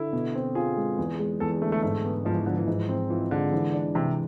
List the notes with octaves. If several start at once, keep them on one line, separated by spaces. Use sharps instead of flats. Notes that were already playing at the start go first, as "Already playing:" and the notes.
Already playing: D3 E4
B2
C4
F4 G#4
G#3
E2
G#3
E2 A4
D3 A3
A3
G#2 A3
B3
G#2 F3
E3
D3 F3
E3
G#2
C4
E3 F4
D3 G#3
E3
D4
C3 E3